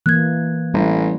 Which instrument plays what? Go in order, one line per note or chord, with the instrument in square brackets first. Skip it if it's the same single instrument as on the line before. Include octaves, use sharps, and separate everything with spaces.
[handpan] E3 A#3 [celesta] F#6 G#6
[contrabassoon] A1 [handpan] G3 E4